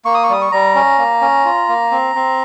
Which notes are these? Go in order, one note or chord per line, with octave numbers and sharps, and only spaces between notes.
A#3 C#6
D#6
C#6
G3 D#6
C#6
G3 A#5
C#4
A#3
C#4
F4
A#3
C4
C4